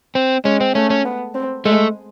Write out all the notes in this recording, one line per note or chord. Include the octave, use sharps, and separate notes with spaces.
C4
G#3 C#4
C4
A3 C#4
C#4
B3
C4
G#3 A3